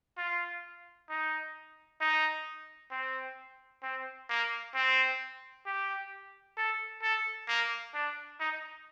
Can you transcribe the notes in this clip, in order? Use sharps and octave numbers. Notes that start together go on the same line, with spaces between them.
F4
D#4
D#4
C4
C4
A#3
C4
G4
A4
A4
A#3
D4
D#4